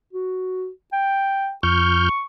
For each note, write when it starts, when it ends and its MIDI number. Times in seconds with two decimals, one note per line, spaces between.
0.13 0.69 66
0.93 1.52 79
1.63 2.09 41
1.63 2.24 85
1.63 2.09 89
1.63 2.09 91